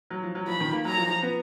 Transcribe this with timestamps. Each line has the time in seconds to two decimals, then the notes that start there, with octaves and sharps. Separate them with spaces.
0.10 F#3
0.23 F3
0.35 F#3
0.48 F3 B5
0.60 D#3
0.73 A#3
0.85 F#3 A#5
0.98 F3
1.10 F3
1.22 B3